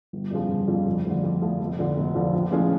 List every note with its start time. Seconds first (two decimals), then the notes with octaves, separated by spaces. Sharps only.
0.13 G1
0.31 F2 C#3 F3
0.49 G1
0.68 F2 C#3 F3
0.86 F2
1.04 D3 F3 A3
1.23 F2
1.42 D3 F3 A3
1.60 F1
1.79 F2 D3 F3
1.96 F1
2.14 F2 D3 F3
2.34 A#1
2.51 A2 F3 G#3 C#4